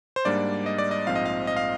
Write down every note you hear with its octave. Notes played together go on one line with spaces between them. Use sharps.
C5
G#2 G3 A#3 D4 D5
D#5
D5
D#5
A#1 G#2 F3 C4 F5
D#5
F5
D#5
F5